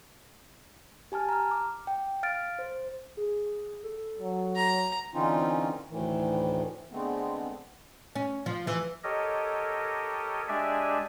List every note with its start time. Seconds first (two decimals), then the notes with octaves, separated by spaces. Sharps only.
1.12 G4 G#5 A5 F6
1.29 A#5 F6
1.51 D6
1.87 G5
2.23 F5 F6 A6 D7
2.59 C5
3.17 G#4
3.83 A4
4.19 F#3
4.56 A#5
5.14 D3 E3 C4 C#4 D#4 F4
5.90 D2 A2 D#3 E3
6.92 D3 G#3 A3 B3 C4
8.15 C#4
8.46 F3
8.67 E3
9.04 G4 A4 A#4 C#5 D#5
10.48 G#3 D4 G4 D5 E5 G#5